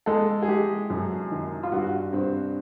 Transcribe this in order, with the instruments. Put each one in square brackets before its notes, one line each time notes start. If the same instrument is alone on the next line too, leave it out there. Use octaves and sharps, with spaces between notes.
[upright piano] G#3 A4
G#4
G#3 G4
F#2
D#3
F4
G2 F#4
G2 C4